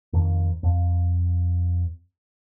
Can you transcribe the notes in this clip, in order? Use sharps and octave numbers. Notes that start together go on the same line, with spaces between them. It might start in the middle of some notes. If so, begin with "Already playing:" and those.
F2 D#3
F2